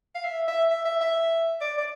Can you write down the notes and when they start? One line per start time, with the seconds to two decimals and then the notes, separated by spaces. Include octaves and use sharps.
0.15 F5
0.25 E5
0.48 E5
0.71 E5
0.85 E5
1.01 E5
1.61 D5
1.78 D5